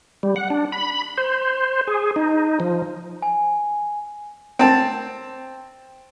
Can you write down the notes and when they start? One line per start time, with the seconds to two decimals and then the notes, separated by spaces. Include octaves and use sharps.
0.23 G3
0.36 F#5
0.50 D4
0.72 B5
1.18 C5
1.87 G#4
2.16 D#4
2.60 F3
3.22 G#5
4.59 C4 A5